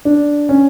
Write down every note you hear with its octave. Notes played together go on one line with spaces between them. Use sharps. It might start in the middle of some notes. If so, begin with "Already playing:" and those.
D4
C#4